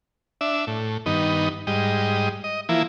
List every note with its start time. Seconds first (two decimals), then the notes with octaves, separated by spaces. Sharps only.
0.41 D4 E5
0.67 A2
1.06 G2 D#3 B3 D#4
1.67 G#2 G3 D#5
2.44 D#5
2.69 E3 F3 A#3 E4